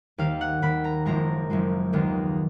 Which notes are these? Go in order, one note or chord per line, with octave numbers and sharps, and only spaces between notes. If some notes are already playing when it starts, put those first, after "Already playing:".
D#2 D#3 A#3 F5
F#5
D#2 D#3 A#3 B5
A#5
F#1 F#2 F3 G#3 A#5
F#1 F#2 F3 G#3
D#2 D#3 G#3 B3